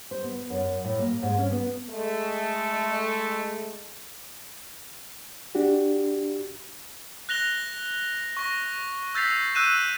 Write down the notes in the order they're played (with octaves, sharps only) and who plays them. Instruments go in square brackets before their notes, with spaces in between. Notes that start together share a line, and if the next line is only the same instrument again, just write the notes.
[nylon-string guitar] C5
B3
F#2
A2
A#3
G#2
C#4
B3
[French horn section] G#3 A3
[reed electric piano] D4 F#4 G4
[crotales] F#6 A#6 F7 G7
C#6 A#6
E6 G6 A6 B6 C7 F7
E6 F#6 G6 D#7 E7